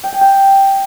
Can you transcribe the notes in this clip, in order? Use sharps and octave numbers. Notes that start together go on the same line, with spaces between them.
G5
G#5
G5